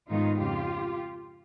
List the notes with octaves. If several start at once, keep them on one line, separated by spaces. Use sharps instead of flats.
G#2 D#3 G#3 B3 D#4 F4
F2 C#3 F3 F4 G4